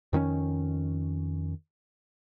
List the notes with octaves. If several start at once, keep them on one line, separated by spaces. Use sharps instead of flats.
F2 D#3 C4 C#4